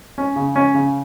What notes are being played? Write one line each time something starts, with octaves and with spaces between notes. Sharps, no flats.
C#4
C#3
C#4
C#3